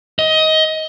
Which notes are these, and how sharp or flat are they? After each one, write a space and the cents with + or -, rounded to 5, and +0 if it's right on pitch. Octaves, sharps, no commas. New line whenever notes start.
D#5 +20